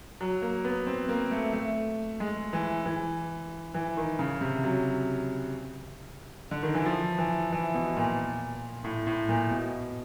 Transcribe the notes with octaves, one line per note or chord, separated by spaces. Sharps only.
F#3
A#3
B3
C4
A#3
A3
A3
G#3
E3
E3
E3
D#3
C#3
C3
F#3
D3
D#3
E3
F3
E3
E3
B2
A#2
A2
A2
A#2
B2